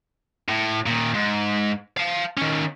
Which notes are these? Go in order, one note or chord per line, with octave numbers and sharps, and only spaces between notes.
A2
A#2 D#3
G#2
F5 A5
D#3 C#4